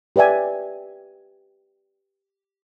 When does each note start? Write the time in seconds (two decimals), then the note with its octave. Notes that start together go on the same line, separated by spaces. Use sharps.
0.16 G4 B4 D5 E5 G#5